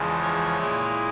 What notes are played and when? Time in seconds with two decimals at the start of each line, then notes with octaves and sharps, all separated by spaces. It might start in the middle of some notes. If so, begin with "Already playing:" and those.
Already playing: E2 C#3 F3 G#3
0.21 C#5
0.56 A#2 G#3 E4